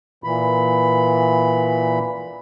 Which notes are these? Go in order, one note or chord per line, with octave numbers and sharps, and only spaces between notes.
A#2 E3 B5